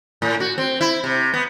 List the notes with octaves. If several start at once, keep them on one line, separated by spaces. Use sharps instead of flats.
A2
F#4
C4
E4
C3
B3